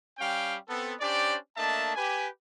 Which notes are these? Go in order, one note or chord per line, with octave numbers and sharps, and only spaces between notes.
G3 C#4 F5 G5
B3 C4 A4
C#4 D4 G4 C5 D5
A3 A#3 D4 D#5 E5 A5
G4 B4 G#5